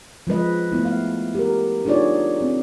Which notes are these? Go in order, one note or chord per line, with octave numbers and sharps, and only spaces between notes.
F3 G#3 B4 D#5
A3 B3 E4
F5
G4 A#4
D4 D#4 F4 G#4 C#5 D5
C4